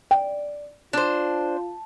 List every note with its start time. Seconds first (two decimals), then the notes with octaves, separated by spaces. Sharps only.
0.11 D5 G5
0.93 D4 F4 C5 A5